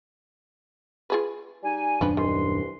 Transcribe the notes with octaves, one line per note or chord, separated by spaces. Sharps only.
F4 G#4 B4
G3 D#4 G#5
D#1 F#2 F3 D4 B4
C2 D#3 B4 C6